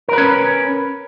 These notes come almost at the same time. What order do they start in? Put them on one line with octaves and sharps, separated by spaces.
A#4 B4 C#4